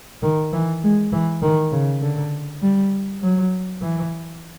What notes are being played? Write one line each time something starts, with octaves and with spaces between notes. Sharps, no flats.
D#3
E3
G#3
E3
D#3
C#3
D3
G3
F#3
E3